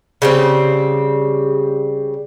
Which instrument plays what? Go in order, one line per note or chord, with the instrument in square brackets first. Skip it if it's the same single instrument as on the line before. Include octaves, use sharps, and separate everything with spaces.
[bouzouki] C#3 G3 C4